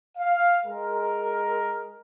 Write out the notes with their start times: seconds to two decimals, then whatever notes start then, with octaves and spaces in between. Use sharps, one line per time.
0.18 F5
0.66 G#3 A#4